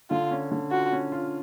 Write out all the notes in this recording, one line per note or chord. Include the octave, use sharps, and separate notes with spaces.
D3 F4
C#4
D3
F4 F#4
C#4
F4